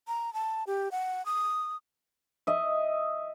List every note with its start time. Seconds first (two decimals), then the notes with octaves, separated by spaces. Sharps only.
0.07 A#5
0.33 A5
0.67 G4
0.92 F#5
1.25 D#6
2.47 D#5 E5